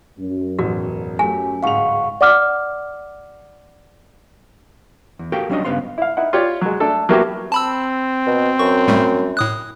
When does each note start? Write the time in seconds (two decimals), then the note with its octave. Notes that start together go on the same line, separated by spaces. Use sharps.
0.19 F#2
0.59 E1 A1 F#4
1.19 F#3 A3 G4 G#5
1.63 D1 G#2 F5 F#5 C#6 F7
2.21 D5 F#5 D6 F6
5.19 E2
5.32 F#4 G4 A4 A#4 F5 G5
5.49 F#3 G3 C#4 D4 C5 D#5
5.65 G2 C#3 B3 B4 F5 C6
5.98 E4 F5
6.17 D#4 E4 F#5
6.33 F4 G4 C#5 D5
6.61 F#3 G#3
6.80 A3 D4 A4
7.09 F#3 A#3 B3 E4 F#4 G4
7.52 C4 A5 B5 E6
8.27 B2
8.59 F#2 C#6
8.88 A2 G3 A3
9.37 A2 D#6 F#6